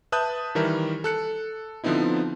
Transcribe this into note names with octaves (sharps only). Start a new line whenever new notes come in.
B4 E5 A5 D#6 F#6 G6
D#3 E3 G3 A#4 E5
A4 F#6 C#7
D3 F3 B3 C4 D#4 E4